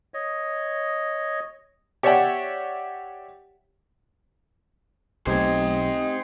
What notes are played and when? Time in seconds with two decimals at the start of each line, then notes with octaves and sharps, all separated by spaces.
0.14 C#5 D#5
2.03 G4 C#5 D5 E5 F#5 G5
5.27 B1 A3 C4 D#4 G4 C5 D#5 G#5